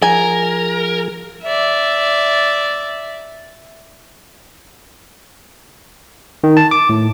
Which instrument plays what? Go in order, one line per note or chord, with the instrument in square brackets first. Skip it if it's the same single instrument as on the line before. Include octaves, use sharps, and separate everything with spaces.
[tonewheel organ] F3 G#4 [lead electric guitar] A#4 [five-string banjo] G#5
[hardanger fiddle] D5 E5
[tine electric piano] D#3
A5
D6
A2